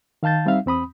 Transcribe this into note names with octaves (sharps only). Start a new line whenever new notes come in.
D#3 F5 A5 G6 A6
G3 C4 D#4 E5 F5
E2 C4 B5 D#6